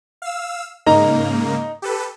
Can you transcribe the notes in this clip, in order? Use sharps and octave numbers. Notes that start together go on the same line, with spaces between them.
F5 E6
G#2 C#3 A#3 D#4 A#5
G4 A4 B4